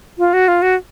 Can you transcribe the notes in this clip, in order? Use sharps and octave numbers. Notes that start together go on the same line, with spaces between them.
F4
F#4
F4
F#4